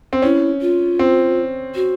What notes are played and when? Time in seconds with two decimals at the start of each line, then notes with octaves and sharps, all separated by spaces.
0.13 C4
0.22 C#4 E4
0.61 F4
0.99 C4
1.75 F#4